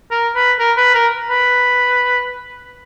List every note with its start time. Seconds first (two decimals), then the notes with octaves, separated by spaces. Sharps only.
0.11 A#4
0.36 B4
0.59 A#4
0.77 B4
0.95 A#4
1.30 B4